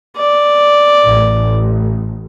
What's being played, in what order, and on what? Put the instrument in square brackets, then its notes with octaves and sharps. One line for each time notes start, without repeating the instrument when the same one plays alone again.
[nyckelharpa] D5
[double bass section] A1